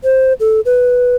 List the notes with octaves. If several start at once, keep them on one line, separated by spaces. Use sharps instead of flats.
C5
A4
B4